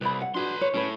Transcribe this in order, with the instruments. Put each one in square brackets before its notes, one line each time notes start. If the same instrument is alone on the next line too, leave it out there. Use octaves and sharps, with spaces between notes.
[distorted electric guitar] C2 [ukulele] B4 D5 B5
[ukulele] F#5
[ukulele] D4 F#4 G#4 [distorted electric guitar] B4 C6
[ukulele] C#5
[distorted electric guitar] A2 [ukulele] C#4 G#4 B4